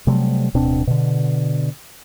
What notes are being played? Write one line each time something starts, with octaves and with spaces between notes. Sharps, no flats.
C3 F#3 G3 A3
D1 B2 C4 D4
B2 D3